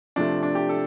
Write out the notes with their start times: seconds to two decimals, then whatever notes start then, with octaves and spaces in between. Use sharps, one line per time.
0.16 C3 F3 A3 D4
0.43 D4
0.55 G4
0.69 A4